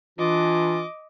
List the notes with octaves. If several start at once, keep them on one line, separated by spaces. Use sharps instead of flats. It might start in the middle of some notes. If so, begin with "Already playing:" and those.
E3 D4 F4 D#5 D6